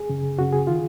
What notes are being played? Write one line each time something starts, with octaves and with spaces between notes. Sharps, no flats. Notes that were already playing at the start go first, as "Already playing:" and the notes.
Already playing: G#4
F#2 C#3
F#2 C#3 F#4
G#4
D#3 F4